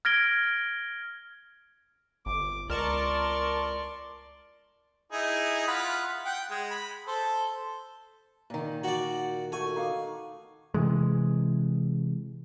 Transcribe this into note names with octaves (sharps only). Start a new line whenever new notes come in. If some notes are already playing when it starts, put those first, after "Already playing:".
F6 G#6 A#6 D7 G7
G1 D6
C#2 A#4 D5 A5 C6 C#6
D#4 E4 G#4
F4 F#5 B5
F#5 G5
G#3
B5
A4 C5
A#2 D#3
F#4 D5
A3 F#4 G#5
D#4 F5 D6
C3 E3 G#3